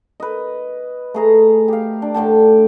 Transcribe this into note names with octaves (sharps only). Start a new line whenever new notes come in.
B4 D#5
A3 G#4 A#5
G4 F5
D4
A2 D3 G5 A5